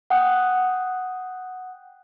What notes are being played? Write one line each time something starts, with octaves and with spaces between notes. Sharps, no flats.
F#5 G5 D#6 F#6